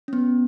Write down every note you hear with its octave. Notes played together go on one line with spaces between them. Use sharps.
C#4
B3